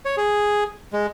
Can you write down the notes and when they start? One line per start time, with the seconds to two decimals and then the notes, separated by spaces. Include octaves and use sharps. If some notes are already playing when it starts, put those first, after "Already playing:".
0.05 C#5
0.17 G#4
0.93 G#3